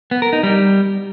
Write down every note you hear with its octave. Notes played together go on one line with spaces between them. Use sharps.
B3
A#4
D#4
G3